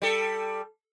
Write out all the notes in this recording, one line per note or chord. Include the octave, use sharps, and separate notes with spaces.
G3 A4